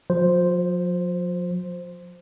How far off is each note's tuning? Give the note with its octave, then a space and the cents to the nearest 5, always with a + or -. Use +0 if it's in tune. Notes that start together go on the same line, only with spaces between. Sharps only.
F3 +45 C5 +0